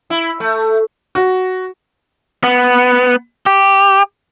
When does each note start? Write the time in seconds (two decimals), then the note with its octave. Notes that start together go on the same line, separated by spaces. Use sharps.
0.10 E4
0.40 A3
1.15 F#4
2.44 B3
3.46 G4